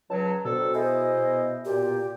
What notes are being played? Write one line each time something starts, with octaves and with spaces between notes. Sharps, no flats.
C#2 F#3 A5
B2 C4 D4 A4
E4 G#4 C5 D#5
A#2 G4